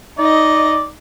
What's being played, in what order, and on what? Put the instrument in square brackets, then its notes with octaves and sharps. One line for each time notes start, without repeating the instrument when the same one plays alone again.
[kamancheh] D#4 D#5 [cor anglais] D5